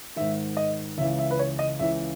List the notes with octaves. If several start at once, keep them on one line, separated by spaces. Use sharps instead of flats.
G#2 D#3 E5
D#5
C#2 C#3 E3 E5
E5
B4
C#5
D#5
C#2 C#3 E3 E5